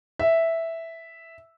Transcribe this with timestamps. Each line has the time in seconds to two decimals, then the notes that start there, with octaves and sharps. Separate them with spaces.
0.19 E5